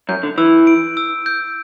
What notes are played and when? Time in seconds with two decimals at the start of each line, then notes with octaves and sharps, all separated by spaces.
0.09 F#2 G6
0.23 D3
0.38 E3 E6
0.67 D7
0.97 E6
1.26 G6